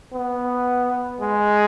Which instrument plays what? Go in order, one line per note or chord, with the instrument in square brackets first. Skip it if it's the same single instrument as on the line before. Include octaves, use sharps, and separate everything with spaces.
[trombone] B3
G#3